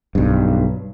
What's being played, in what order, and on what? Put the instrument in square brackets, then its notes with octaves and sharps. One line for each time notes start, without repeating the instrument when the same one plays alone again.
[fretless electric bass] B1 G2